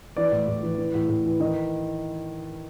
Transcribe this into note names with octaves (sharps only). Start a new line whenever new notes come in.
E3 D5
A2
A2
E3
E3
A2
A2
E3
D#3 D#5